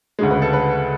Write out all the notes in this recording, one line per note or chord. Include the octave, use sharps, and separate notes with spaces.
D2 C#3 G#3
B4
A4
B4